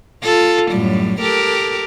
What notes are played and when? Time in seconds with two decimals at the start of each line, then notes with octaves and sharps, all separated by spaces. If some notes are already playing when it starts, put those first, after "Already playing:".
0.23 F4 A4
0.71 F#2 A2 G3
1.21 G4 A4 A#4